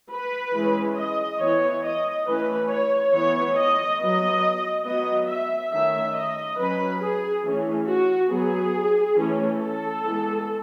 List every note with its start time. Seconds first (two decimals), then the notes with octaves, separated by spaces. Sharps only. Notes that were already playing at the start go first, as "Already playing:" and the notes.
0.11 B4
0.53 E3 G#3 C#4
0.97 D#5
1.40 E3 B3 C#5
1.83 D#5
2.26 E3 A3 C#4 B4
2.69 C#5
3.12 E3 B3 C#5
3.56 D#5
3.99 F#3 B3 D#5
4.85 F#3 B3 D#5
5.27 E5
5.71 D#3 A3 C#4 E5
6.14 D#5
6.57 F#3 C#4 B4
7.00 G#4
7.44 E3 A3 C#4
7.87 F#4
8.29 F#3 B3 G#4
9.15 E3 A3 C#4
9.59 A4
10.02 E3 G#3 B3